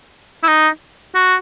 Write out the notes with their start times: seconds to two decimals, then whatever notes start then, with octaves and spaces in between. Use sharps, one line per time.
0.43 E4
0.48 D#4
1.15 F#4